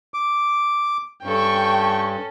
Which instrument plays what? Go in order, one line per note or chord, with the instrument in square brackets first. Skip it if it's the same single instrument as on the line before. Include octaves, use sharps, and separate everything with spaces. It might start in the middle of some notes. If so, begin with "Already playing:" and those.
[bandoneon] D6
[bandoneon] G2 [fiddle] C#4 A4 [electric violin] G5 C#6